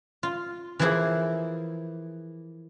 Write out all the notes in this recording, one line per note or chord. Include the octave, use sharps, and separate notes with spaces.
F4
E3 F3 A#3 E4 G#4